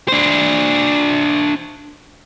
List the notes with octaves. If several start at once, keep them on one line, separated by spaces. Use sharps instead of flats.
D4 C5